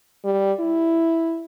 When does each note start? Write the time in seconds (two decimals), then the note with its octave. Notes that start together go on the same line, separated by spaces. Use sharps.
0.25 G3
0.59 E4